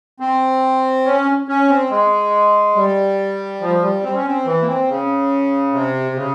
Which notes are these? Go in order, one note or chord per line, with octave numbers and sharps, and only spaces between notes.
C4
C#4
C#4
C4
G#3
G3
F3
G3
C4
C#4
C4
E3
A#3
C4
C#3
C3
C#3